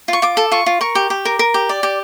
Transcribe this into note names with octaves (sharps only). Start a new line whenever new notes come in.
F4 C#6
F4 D6
A4
F4 C#6
F4
A#4 C#6
G4
G4
A#4
A#4
G4
D5
G4